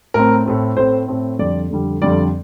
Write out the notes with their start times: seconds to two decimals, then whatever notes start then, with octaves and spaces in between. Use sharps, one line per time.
0.14 A2 A3 C4 A#4
0.46 A2 A3 C4
0.77 A2 A3 C4 C5
1.08 A2 A3 C4
1.39 F2 D3 G3 D5
1.70 F2 D3 G3
2.01 F2 D3 G3 D5